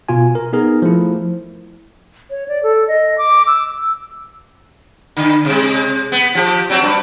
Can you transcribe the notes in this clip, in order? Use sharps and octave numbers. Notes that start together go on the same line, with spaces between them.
B2 F4 G#5
A#4
B3 D#4 G#4 A#4
F3 A3 E4
C#5
D5
A4
D#5
D6
E6
E6
D3
C3 G#3
B3
F3 G4
F#3 C4
G2